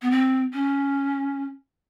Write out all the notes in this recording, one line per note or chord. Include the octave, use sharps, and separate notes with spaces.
B3
C4
C#4